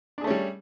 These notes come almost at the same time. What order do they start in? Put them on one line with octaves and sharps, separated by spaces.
D4 G#4 A3 C#4 G3